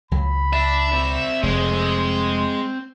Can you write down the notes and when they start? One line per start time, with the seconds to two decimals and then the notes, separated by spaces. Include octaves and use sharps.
0.11 C#2 F#3 B5
0.53 D4 E5
0.92 C4 D5
1.43 F1 G#3 C6